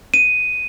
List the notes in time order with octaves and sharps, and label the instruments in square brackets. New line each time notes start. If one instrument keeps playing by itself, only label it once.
[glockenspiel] D#7